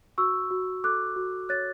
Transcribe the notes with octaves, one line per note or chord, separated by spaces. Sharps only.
F#4 C#6 E6
F#4
A4 D6 F#6
F#4
C#5 F#6 A6